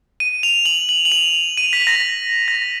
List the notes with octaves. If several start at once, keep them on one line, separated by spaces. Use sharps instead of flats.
D#7
F7
F#7
F#7
F#7
F7
D#7
B6
A#6
A#6